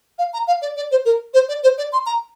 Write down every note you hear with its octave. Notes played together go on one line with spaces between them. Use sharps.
F5
A#5
F5
D5
D5
C5
A#4
C5
D5
C5
D5
C6
A#5